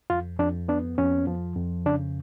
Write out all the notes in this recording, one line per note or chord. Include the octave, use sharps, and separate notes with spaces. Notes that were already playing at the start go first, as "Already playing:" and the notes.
F2 F4
F2 D4
B3 D4
F2 C#4
F3
F2
C#3 D4